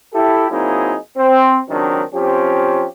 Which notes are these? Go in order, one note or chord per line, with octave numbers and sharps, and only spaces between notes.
E4 G4 A4
F#3 A#3 C4 D#4 E4 G#4
C4
C#2 D#3 F#3 C4 D4
F3 C4 C#4 G4